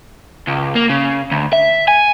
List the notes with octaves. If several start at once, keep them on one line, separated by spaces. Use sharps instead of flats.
C#2
A#3
C#3
D2
E5
G#5